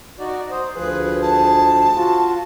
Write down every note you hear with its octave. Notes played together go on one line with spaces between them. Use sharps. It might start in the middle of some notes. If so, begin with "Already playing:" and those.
D#4 F#4 D5
C5 D#6
D2 F3 G#4 B4
A5
F4 F#4